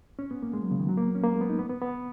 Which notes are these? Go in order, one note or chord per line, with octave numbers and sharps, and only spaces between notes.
C#4
B3
A#3
G#3
F#3
C#3
D#3
F#3
A#3
B3
C#4
A#3
G#3
B3
D#4
B3
B3
B3